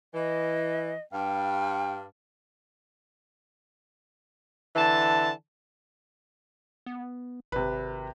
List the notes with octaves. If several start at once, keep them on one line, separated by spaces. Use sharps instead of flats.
E3 D#5
G2 F5 G5
D3 E3 A5
B3
G#1 C3 B4